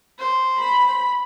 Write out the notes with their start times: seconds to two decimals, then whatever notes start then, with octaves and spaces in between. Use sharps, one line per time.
0.18 C5
0.57 B5